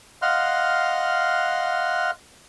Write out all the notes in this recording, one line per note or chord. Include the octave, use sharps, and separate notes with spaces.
D#5 F5 F#5 C6 F6 F#6